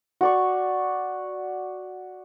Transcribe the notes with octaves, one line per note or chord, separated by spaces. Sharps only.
F#4 D5 C#6